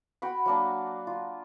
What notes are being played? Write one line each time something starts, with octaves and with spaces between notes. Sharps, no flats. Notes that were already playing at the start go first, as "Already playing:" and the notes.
F#4 G5 B5
F#3 A#3 D4
F4